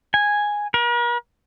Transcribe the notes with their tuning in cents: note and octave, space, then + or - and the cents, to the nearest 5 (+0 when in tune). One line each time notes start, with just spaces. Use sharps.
G#5 -5
A#4 +45